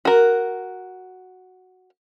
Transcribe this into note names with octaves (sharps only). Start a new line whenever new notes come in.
F#4 A#4